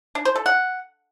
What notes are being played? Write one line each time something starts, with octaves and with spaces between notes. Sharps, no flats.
D4
C5
A4
F#5